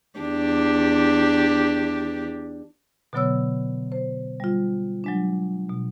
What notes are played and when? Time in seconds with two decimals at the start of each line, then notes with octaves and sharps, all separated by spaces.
0.19 E2 D4 G4
3.13 B2 D3 F#3 B3 C#5 E6
3.92 C5
4.40 G3 F4
5.04 F#3 G#3 D4
5.69 B2